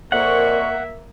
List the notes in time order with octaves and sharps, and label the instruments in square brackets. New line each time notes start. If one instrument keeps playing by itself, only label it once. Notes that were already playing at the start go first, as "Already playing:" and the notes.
[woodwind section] F2 A#2 C#6 [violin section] A#3 [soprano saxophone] E5 [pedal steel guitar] F#5